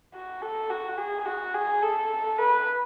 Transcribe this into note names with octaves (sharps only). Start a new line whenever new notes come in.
F#4
A4
F#4
G#4
F#4
G#4
A4
B4